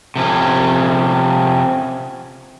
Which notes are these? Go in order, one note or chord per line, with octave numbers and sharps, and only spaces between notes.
C3 F3 C#4